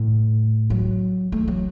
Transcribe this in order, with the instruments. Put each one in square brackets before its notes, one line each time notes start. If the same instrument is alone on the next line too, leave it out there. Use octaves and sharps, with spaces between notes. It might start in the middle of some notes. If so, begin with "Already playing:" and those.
Already playing: [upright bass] A2
F#3
A3
F#3